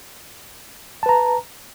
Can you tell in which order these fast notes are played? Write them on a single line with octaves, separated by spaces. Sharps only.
A5 B4 A#5